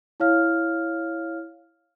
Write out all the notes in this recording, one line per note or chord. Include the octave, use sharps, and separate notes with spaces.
E4 C#5 F5 F6